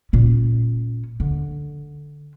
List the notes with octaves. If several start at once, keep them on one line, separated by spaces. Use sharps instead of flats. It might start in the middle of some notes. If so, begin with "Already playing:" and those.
A#2 C#4
D3